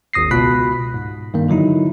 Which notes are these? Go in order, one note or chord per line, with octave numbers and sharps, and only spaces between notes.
G#1 D#2 D#6 A#6 C7
C#2 B2 F4 B5 F#6 B6
G#2
G2 D#3 A#3
D3 F#3 D#4 E4